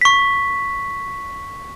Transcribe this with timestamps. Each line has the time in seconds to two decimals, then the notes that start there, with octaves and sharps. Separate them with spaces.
0.01 C#6 B6